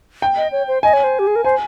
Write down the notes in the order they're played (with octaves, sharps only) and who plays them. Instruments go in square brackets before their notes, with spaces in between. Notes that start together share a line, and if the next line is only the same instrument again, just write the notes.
[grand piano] G5
[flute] D#5
C#5
C5
[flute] D#5 [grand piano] G#5
[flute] C#5
C5
G4
G#4
A#4
[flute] C5 [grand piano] G#5